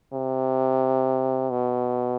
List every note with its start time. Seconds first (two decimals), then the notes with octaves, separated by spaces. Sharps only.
0.13 C3
1.51 B2